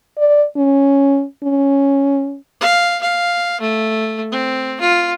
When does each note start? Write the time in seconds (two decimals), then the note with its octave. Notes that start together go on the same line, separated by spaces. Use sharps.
0.18 D5
0.56 C#4
1.44 C#4
2.61 F5
3.01 F5
3.61 A3
4.32 C4
4.81 F4